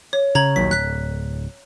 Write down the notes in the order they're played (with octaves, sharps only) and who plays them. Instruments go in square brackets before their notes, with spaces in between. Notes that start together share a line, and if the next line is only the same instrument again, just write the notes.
[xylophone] C#5
[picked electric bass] C#3 [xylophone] A#5 G#6 F#7
[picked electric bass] A#1 D#2 F#3 [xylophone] B6
[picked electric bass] D1 [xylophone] F#6 B6